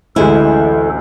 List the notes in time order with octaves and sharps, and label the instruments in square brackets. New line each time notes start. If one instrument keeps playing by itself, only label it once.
[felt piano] A1 D2 [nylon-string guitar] G#3 E4 [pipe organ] A4